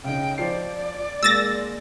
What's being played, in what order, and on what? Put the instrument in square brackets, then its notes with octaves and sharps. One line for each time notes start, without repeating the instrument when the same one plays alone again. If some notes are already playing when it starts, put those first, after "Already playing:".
[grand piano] C#3 D#4 [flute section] G5
[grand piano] F3 C5 C7 [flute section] D5
[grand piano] G#3 A#3 [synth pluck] E6 A6 A#6